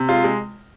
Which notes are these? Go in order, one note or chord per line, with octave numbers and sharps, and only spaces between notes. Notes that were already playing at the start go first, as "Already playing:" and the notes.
Already playing: C3
G#3 F4
G#3